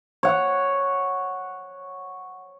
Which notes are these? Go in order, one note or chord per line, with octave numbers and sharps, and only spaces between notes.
C#5 F#5